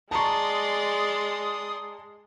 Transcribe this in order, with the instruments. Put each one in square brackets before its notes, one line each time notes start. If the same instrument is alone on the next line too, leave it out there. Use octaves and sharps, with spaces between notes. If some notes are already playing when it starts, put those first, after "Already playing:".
[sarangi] G#3 [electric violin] D5 C6 [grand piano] A5 A#5 C#6 [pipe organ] D#6